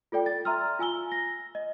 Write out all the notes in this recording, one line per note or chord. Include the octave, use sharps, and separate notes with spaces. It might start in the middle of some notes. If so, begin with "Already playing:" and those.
F4 A4 D5 G5
A6
E5 A#5 C6 E6 F6
F4 G#5 E6 G7
A#6
D#5